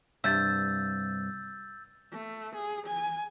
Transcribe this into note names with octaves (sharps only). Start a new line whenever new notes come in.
C2 G2 E5 E6 G6 A6
A3
G#4
G#5